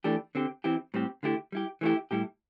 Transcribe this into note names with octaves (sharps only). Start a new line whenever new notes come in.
E3 A3 D4 G4
D3 C4 G4
E3 C4 E4 G4
A2 G3 C4 G4
D3 A3 E4 G4
G3 E4 G4
E3 A3 C4 E4 G4
A2 G3 E4 G4